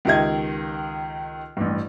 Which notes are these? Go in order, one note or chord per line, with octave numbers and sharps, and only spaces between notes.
C#2 D#3 G4 D#5 G#6
A1 G2